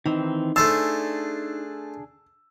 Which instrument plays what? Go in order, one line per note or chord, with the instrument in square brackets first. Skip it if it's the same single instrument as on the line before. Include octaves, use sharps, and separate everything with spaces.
[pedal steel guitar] D#3 E3 C4 [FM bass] D#4
[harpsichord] A3 C5 A5 [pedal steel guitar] D4 G#4 [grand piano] E6